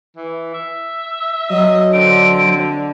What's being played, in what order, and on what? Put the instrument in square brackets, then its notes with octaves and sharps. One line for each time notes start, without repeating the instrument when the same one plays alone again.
[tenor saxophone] E3
E5
[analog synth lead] F#3 [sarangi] D#5
[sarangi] D3 [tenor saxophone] C4 [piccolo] D7